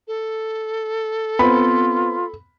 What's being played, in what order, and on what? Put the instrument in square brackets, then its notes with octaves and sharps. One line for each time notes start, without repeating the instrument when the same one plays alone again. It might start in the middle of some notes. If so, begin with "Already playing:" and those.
[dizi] A4
[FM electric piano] B3 C4 [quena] F4 [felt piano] B5